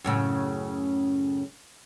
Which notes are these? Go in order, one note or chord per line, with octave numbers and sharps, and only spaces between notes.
F#2 A2 C#3